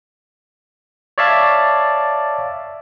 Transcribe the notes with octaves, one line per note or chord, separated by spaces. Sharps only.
C#5 D5 E5 F5 A5